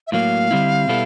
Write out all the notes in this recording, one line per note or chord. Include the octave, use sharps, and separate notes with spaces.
E5
A2 F#3 A#3 F5
D3 G3 C4 E4
B2 G3 B3 E4 A4